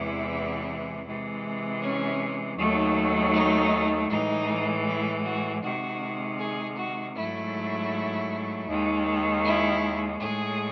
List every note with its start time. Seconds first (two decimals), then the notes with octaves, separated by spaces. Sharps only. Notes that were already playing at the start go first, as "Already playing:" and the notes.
Already playing: E2 C3 E3 G#3 E4
1.06 C3 E3 G#3
1.81 C#4
2.58 D#2 D#3 F#3 A3
3.34 D#4
4.10 A2 E3 G#3 D#4
4.87 E4
5.25 F#4
5.63 C3 D#3 G#3 F#4
6.39 G#4
6.77 F#4
7.16 G#2 F#3 A3 E4
8.68 D#2 D#3 G#3
9.44 E4
10.20 A2 G#3 G#4